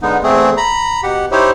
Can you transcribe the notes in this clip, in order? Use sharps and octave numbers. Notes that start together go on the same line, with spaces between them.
D3 G#3 B3 D#4
E2 A3 C4 G#4
A#5 B5
B2 G4 F#5
D#4 E4 G4 C5 C#5